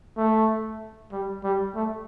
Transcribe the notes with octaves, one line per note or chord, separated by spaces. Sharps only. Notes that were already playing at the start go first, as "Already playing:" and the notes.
A3
G3
G3
A3